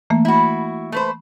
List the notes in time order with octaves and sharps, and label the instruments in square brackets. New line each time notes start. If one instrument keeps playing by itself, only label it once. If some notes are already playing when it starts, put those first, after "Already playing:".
[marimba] E3 A3 A#3
[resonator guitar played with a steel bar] E4 F#4
A3 B4 C5